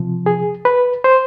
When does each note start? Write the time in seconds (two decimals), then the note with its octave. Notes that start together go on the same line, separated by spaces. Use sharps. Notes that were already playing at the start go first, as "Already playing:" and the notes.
Already playing: C3 F3
0.26 G#4
0.65 B4
1.04 C5